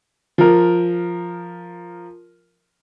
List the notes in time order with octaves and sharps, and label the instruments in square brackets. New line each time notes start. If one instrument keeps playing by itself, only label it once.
[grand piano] F3 A#4